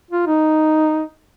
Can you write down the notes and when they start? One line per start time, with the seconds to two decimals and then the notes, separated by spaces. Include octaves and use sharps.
0.11 F4
0.27 D#4